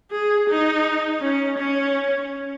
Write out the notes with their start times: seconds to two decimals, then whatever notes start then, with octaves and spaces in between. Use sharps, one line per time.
0.12 G#4
0.49 D#4
1.21 C#4
1.58 C#4